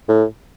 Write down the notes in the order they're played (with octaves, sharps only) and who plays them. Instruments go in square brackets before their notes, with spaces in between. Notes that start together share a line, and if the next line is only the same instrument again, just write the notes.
[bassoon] A2